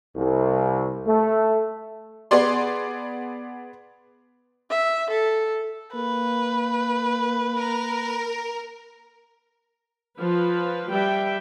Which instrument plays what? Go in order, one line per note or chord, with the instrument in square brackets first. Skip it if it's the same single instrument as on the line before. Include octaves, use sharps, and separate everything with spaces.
[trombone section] C2
A3
[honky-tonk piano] B3 G#4 D5 C6
[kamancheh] E5
A4
[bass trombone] A#3 [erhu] B4
[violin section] A#4
[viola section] F3 B4
G3 B4 E5 G5